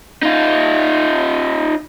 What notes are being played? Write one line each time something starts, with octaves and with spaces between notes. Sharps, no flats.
D#4 F4